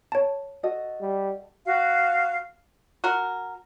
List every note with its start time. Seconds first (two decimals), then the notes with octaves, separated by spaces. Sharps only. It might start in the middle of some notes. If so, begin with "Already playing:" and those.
0.12 C#5 A5
0.63 F#4 A4 D#5
1.00 G3
1.65 F#4 F5
3.04 F#4 A#4